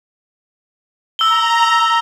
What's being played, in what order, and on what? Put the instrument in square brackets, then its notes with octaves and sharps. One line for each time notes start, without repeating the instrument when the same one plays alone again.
[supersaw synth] A#5 [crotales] E6 G7